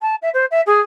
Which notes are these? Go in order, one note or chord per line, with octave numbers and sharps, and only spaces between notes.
A5
E5
C5
E5
G#4